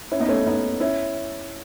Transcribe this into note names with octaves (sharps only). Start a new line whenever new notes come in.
C#4 E4
B3 D#4
A3 C#4
B3 D#4
C#4 E4